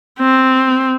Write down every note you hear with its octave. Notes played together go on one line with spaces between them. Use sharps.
C4